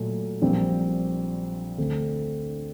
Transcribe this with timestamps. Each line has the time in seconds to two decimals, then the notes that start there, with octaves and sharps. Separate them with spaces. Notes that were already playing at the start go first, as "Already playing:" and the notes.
Already playing: A#2 F#3 A3
0.42 A#1 A#2 G3 C4
1.78 D2 D3 A3 C4